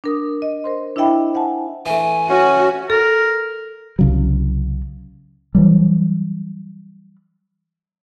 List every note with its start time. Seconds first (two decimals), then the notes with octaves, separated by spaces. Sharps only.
0.04 D4 A#4 D#6
0.42 D#5
0.64 A#4 C5 C6
0.96 D4 E4 D#5 E5 G5 B5
1.34 C5 E5 F#5 G#5 A5
1.86 E3 A3 G#5
2.29 C#4 F#4
2.90 A4 A#4
3.99 C2 C#3 F#3
5.55 E3 F#3 G3